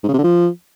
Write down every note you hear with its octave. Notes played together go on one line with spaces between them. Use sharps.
G#2
C#3
C3
D3
F3